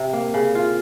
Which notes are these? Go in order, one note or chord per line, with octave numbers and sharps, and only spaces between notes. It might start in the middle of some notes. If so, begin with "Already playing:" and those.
Already playing: C3
A#3
C#3
F4